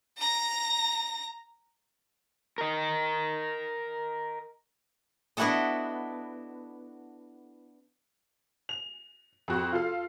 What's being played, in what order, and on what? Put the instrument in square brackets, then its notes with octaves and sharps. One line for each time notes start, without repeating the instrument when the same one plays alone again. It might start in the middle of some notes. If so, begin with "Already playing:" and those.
[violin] A#5 A#6
[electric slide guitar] A#4 D#5
[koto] B3 D4 E4 F#4 A4 D#5
[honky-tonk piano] F7
F2 F#4
F4 A4 F5